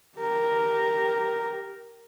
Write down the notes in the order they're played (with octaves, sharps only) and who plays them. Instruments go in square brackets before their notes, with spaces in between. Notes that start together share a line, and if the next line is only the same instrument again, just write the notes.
[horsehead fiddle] G4 A#4